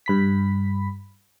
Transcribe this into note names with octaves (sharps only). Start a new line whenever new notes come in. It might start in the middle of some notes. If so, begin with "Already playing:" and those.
G2 B5 B6